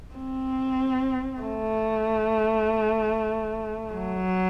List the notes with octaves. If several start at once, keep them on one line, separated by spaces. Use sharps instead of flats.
C4
A3
F#3